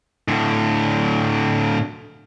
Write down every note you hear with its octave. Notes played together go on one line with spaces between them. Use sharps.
A2 D3